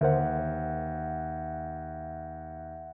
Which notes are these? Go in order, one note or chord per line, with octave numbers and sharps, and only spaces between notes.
D#2 D3 A#4 C5 E5 F#5